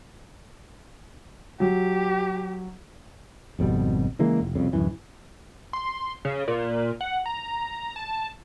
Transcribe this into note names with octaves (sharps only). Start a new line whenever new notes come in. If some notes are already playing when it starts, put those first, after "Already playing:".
F#3 G4
G#1 F2 B2 G3
C#3 E3 G#3 A#3
F1
C2 F2 C#3
D1 G#1 F#2 E3
C6
C#3
A#2
F#5
A#5
A5